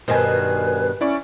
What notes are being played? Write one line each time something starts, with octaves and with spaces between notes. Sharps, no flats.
G2 B2 D#3 B4 C5 G#5
C#4 E4 D5 C#6